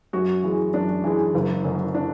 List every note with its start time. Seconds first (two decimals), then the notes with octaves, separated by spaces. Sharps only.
0.13 F#2 F#4
0.43 E3 G#3
0.74 F#2 D4
1.04 E3 G#3
1.34 F#1
1.64 F#2 D3
1.94 D4